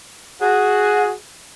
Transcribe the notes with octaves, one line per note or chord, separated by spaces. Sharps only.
F#4 G#4